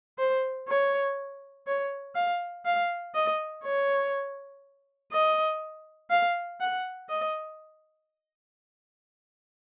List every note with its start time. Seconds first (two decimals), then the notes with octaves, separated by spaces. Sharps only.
0.19 C5
0.69 C#5
1.67 C#5
2.15 F5
2.65 F5
3.15 D#5
3.64 C#5
5.12 D#5
6.11 F5
6.61 F#5
7.10 D#5